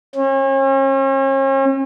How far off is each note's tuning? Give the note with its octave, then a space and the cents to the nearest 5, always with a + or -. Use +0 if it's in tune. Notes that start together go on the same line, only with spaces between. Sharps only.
C#4 -40